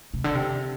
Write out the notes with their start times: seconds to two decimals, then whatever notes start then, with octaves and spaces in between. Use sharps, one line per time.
0.14 C3
0.24 D3
0.35 C3